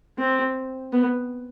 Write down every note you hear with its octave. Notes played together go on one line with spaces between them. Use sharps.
C4
B3